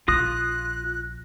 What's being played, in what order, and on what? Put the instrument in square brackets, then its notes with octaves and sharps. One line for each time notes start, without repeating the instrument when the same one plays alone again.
[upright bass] A#1 [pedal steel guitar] F4 D#6 [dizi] F#6 [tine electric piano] A#6